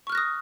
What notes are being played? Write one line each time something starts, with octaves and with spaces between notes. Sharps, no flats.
C#6 D#6 F6 F#6 A#6